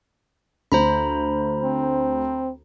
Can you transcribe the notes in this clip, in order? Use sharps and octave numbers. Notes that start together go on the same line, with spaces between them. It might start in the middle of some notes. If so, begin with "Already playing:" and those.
D2 C5 A#5 B5
C4